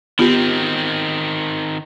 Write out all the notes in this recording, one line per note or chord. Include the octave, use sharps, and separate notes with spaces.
D#3 B3 C4 F4 G4